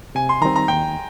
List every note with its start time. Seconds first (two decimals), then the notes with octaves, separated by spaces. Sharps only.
0.15 C3 G#5
0.29 C6
0.42 D#3 G3 C4 D#4 A#5
0.56 A#5
0.68 D#2 G5